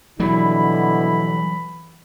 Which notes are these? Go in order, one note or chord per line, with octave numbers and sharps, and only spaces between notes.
B2 D3 E3 F#3 G3 E4 B5